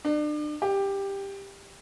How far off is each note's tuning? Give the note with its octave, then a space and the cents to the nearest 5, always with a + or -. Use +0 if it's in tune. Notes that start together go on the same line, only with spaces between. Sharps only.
D4 +35
G4 +10